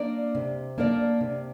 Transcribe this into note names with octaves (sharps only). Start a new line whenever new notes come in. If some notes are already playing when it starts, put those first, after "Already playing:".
Already playing: A#3 D4 A#4 D5
C3
A#3 D4 A#4 D5
C3